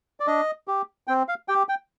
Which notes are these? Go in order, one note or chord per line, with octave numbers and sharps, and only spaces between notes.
D5
D4 D#5
G4
C4 G5
F5
G4 G5
G5